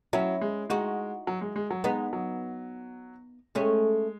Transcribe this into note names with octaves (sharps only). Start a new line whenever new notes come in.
F#3 C#4 E4
G#3
G#3 D#4 F#4
F#3
G#3
G#3
F#3
G#3 B3 D#4
F#3
G#3 A3 C#4